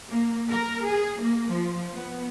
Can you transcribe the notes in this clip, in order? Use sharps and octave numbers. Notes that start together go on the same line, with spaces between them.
A#3
A#4
G#4
A#3
F3
B3